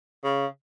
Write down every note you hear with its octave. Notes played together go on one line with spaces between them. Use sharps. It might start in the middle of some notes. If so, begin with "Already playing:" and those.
C#3